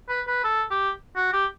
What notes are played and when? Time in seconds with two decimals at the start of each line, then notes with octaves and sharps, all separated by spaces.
0.09 B4
0.27 B4
0.44 A4
0.71 G4
1.16 F#4
1.33 G4